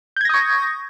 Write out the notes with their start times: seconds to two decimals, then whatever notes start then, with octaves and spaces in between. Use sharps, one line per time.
0.17 G6
0.21 G#6
0.25 A#6
0.29 D#6
0.34 C#6